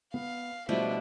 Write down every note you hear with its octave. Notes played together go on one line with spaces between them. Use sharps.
B3 F5
B2 F3 G3 A3 D4 E4